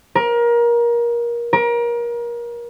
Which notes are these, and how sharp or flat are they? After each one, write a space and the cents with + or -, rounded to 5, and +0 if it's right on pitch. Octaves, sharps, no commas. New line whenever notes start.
A#4 +25
A#4 +30